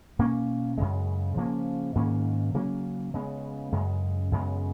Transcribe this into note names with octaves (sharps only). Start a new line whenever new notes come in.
B2 A#3 C#4
F#2 C#3 G#3
C#3 F3 A#3 C#4
G#2 D#3 A#3 C#4
C#3 F#3 A#3 C#4
C#3 G#3 B3
F#2 C#3 G#3
F#2 C#3 G#3 B3